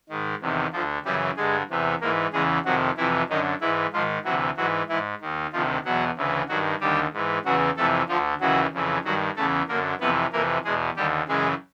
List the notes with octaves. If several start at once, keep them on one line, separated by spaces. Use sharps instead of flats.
G#2 D#3
E2 C3 D#3
D2 D3 F3 F4
F#2 C#3 E3 G3 G4
G2 D3 G#3 G#4
E2 C3 E3
G#2 E3 A#3 A#4
E2 C#3 E3 G#3 G#4
F2 C3 D#3 F#3 F#4
F2 C3 E3 E4
F#2 D3 D#3 D#4
G#2 E3 E4
G#2 D#3 F3 F4
D2 C3 E3 F#3 F#4
G#2 E3 F#3 F#4
G#2 E3 E4
D#2 D#3
D2 C3 D#3 F3 F4
E2 B2 F#3 F#4
D2 C#3 E3
G2 D#3 F#3 F#4
D#2 D3 G3 G4
G#2 E3
E2 C#3 E3 F#3 F#4
F2 C3 E3 A3 A4
D2 D3 F3 F4
D#2 C#3 E3 F#3 F#4
F2 C#3 E3
G2 D#3 F#3 F#4
E2 C#3 E3 A3 A4
F#2 D3 A#3 A#4
F2 C3 E3 B3 B4
F2 C3 E3 A#3 A#4
E2 B2 G#3 G#4
D#2 D3 G3 G4
F#2 C#3 E3 G#3 G#4